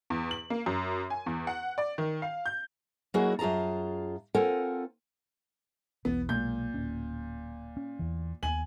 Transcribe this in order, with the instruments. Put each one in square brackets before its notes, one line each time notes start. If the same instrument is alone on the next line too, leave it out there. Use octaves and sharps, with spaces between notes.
[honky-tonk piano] E2
F#7
A#3
F#2
G#5
E2
F#5
D5
D#3
F5
G6
[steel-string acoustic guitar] F#3 A#3 D#4 E4 F#4 G#4
F#2 F4 G#4 A5 A#5
C4 F4 A4 A#4 F#5 G#5
[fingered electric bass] E1 B1 E3 [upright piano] B3
[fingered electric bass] B1 G#3 [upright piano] A#2 G6
[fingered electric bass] D1 C#4
C#4
E2 E3
[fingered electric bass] D#2 B3 [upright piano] G#5 F#7